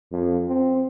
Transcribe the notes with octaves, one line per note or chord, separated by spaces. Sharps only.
F2
C4